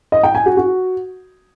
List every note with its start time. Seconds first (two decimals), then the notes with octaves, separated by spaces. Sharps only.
0.12 D#5
0.23 G5
0.35 G#5
0.46 F#4
0.57 F#4